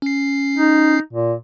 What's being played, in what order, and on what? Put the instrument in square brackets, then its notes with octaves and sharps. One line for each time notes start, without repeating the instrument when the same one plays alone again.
[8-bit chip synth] C#4 C7
[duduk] D#4
A#2